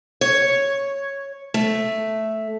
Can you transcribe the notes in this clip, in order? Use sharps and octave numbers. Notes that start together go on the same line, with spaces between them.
C#5
A3